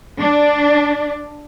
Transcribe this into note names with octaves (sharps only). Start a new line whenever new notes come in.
D4